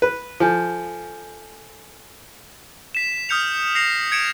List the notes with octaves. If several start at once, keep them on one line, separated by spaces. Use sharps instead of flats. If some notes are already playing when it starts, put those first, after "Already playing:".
B4
F3 A4 G#5 G6
B6 E7
D#6 F6 G6 C#7 F7
A#6 C7 C#7 F7
G#6 C#7 D7 E7